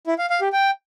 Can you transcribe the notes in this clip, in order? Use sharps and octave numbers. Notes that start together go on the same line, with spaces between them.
E4
F5
F5
G4
G5